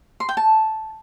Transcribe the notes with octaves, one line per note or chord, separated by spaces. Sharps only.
C6
G5
A5